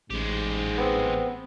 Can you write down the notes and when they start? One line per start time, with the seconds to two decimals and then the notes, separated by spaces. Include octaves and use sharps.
0.10 A1 G#2 G#3 G4
0.78 B3 C4